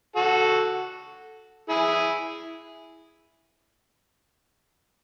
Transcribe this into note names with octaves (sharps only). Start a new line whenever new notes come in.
F#4 A4
E4 G#4